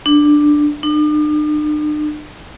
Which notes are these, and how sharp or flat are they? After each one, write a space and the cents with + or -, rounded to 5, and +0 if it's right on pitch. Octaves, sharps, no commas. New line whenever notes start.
D4 +10
D4 +45